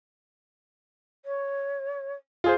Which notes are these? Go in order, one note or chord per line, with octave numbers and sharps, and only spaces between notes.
C#5
F4 G#4 C5